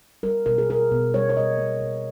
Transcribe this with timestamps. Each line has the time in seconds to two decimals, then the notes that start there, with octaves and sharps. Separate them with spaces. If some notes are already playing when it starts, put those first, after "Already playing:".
0.23 G3 A#4
0.46 B2 A#4
0.58 G#4
0.69 A#3 A#4
0.91 B2
1.14 G3 C#5
1.29 C#5
1.36 B2 D#5
1.58 A#3
1.81 B2